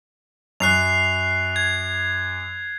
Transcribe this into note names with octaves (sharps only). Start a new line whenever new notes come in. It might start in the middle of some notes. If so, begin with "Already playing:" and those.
F#2 F#6 C7 F7
G#6